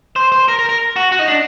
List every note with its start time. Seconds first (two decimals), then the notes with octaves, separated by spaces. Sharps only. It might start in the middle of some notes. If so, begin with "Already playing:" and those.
0.16 C5
0.32 C5
0.48 A#4
0.59 A#4
0.69 A#4
0.96 F#4
1.12 F#4
1.19 D#4
1.28 D4